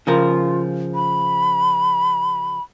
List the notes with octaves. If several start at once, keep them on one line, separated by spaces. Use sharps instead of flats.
C#3 F3 F4 A#4
B5